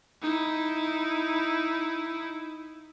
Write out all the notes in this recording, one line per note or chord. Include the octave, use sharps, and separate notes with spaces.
D#4 E4